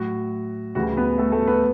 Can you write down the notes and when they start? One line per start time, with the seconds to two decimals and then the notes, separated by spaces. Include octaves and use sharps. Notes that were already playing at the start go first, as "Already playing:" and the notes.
Already playing: A2 F#3 F#4
0.75 D2 C#3 E3 G3 F#4
0.97 B3 B4
1.18 A3 A4
1.32 A3 A4
1.48 B3 B4